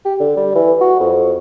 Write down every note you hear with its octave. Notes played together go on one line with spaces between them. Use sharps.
G4
D3
G3
E3
F#4
F2